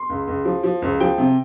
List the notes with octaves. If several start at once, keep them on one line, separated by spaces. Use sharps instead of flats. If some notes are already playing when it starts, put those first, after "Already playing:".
Already playing: C6
C#2
C#2
F3
F3
C#2
F3 G5
C3